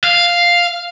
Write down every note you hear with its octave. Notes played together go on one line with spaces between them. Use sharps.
F5